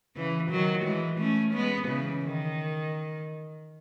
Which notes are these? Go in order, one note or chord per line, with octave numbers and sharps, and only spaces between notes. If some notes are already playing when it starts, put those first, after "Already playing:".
C#3 E3
D#3 F#3
E3 G#3
A3 C#4
G#3 B3
C#3 E3
D#3